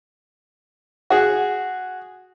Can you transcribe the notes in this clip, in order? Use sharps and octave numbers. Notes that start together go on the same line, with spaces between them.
F#4 G#4